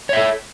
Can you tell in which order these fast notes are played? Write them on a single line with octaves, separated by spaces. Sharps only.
C#5 E5 A4